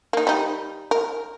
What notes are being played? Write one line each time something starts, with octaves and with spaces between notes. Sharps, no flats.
A#3 D#4
G3 D#4
A#4